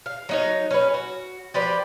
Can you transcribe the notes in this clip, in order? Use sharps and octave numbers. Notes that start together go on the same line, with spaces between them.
F5
F#3 D#4 C#5
C#4 B4
F#4
F3 G4 B4 D5